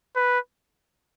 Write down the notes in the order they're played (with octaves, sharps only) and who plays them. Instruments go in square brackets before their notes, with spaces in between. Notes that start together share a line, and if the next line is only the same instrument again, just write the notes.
[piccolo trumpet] B4